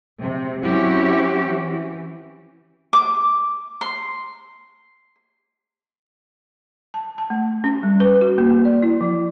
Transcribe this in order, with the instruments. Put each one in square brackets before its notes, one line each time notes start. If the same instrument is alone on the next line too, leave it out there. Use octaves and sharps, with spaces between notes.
[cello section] C3
F#3 C4 C#4 E4 F#4 G4
E3
[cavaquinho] D6
C6
[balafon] A5
A5
A3
C#4
G3
B4
F#4
A#3
A#3
D5
E4
F3